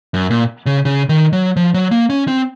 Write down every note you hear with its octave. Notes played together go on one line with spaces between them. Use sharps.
F#2
A#2
C#3
C#3
D#3
F#3
F3
F#3
A#3
C#4
C4